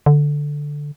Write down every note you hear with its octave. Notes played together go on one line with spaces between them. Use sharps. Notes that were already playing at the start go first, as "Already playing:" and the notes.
D3